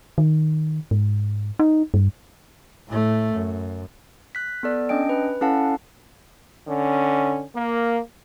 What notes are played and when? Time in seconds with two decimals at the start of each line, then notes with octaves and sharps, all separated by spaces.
0.18 D#3
0.91 G#2
1.59 D#4
1.94 G2
2.88 A2 A3
3.33 F#2
4.35 F#6 B6
4.63 B3 A4 D5
4.89 C#4 D4 D#5 G5 D7
5.09 B4
5.41 C#4 E4 A4 F5 F#5 A5
6.67 D3 C#4
7.55 A#3